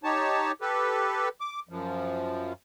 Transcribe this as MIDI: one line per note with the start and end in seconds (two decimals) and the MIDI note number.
0.04 0.52 63
0.04 0.52 67
0.04 0.52 73
0.04 0.52 81
0.61 1.29 67
0.61 1.29 69
0.61 1.29 71
1.41 1.60 86
1.69 2.53 42
1.69 2.53 53